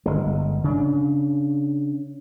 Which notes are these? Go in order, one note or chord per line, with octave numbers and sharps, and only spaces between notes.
G1 G#3
C#3 D4